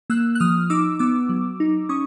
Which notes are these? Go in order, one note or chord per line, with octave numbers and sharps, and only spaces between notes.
A#3 E6 F#6
F#6
F3 D#6 F6
D#4 D6 E6
B3 D6 E6
F#3
D#4
C#4 C#6 D#6